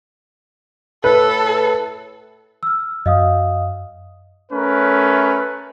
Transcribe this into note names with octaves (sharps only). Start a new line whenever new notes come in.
A2 A4 B4
E6 F6
F#2 D#5 F5 D#6
A3 C#4 A#4 B4